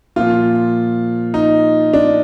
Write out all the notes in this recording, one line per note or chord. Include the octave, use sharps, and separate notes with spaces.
A#2 F3 F4
D#4
D4